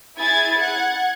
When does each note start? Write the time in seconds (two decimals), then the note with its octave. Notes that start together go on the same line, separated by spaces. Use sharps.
0.17 E4 G#4 G#6 A6
0.58 F#5 G#6